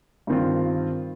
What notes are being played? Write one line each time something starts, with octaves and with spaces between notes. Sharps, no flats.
G2 D#3 C4 F4